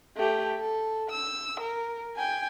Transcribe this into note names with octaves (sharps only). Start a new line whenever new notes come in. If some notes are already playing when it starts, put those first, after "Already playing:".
A3 G4
A4
E6
A#4
G5 G#5